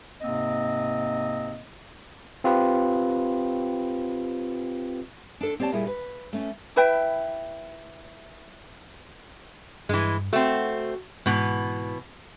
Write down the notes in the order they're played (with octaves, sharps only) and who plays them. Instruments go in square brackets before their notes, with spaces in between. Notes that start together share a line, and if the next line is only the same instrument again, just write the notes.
[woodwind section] G#2 C3 A#3 C4 D#5
[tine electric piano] C4 F4 G4 B4
[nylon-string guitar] D4 A4
C4 G4 C#5 D5 A5
A#2 G3 E4 G#4
B4
A3 C#4
[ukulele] E4 B4 E5 G5
[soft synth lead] G2 [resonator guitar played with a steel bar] E3 G#3
[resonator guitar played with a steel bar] A3 C4 [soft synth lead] F#4
[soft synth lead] G#2 [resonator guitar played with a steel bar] B2 E3 B3